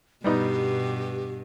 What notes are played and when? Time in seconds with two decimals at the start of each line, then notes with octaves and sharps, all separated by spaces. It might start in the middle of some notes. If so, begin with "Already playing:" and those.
0.24 G2 B2 G3 B3 D#4 G4